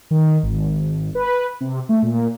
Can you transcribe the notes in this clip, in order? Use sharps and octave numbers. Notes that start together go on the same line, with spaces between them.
D#3
G#1
B4
C3
A3
A#2